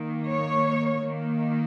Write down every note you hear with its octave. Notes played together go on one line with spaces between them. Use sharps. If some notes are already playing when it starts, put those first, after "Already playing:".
Already playing: D#3 A#3
C#5
D#3 A#3